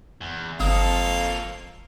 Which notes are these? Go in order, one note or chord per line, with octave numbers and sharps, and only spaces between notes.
E2
G1 F2 A#3 A4 F5 D#6